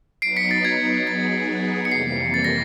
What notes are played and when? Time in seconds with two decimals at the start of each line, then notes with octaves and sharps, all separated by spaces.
0.22 F#3 B3 D#4 C7 D7
0.37 B6 C#7
0.51 A6
0.65 G#6
1.07 F#3 B3 D#4 G#4 A6
1.85 C#7
1.92 F2 C3 E3 G3 A#3 C7
2.34 A6
2.44 A#6